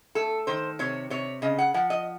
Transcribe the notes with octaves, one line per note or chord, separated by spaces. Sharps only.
A3 A4
D#3 C5
C3 C#5
C3 C#5
C#3 D#5
F#5
F3 F#5
D#5